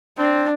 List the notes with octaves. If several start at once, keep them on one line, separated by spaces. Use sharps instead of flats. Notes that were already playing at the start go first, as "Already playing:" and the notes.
C4 D4